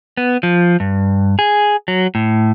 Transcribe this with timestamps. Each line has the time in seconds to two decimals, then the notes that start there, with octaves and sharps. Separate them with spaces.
0.17 B3
0.43 F3
0.80 G2
1.39 G#4
1.88 F#3
2.15 A2